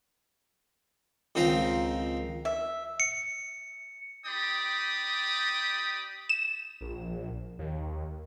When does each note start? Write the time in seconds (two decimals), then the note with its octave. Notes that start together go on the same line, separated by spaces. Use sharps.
1.35 C#2 D#3 C4 D#4 F4 A#4
2.45 E5
3.00 C#7
4.26 D#4 G4 D5 G5 B5 D#6
6.29 E7
6.81 A#1
7.59 D#2